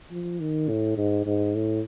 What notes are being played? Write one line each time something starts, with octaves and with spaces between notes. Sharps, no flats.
F3
D#3
A2
G#2
G#2
A2